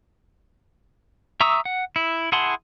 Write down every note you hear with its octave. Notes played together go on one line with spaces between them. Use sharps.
E5 A#5 C#6 D#6 E6
F#5
E4
E4 G#4 F#5 A5 C6